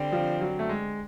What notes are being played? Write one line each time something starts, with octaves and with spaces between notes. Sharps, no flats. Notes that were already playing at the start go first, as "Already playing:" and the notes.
Already playing: D3 G3 C4
F3
F#3
A3
G#3